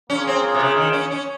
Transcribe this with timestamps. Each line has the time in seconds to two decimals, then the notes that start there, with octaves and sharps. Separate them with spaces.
0.10 A#3 C#4 F4 G#4
0.27 C4
0.54 C3
0.60 C#3
0.76 D#3
0.93 C#4
1.11 C#4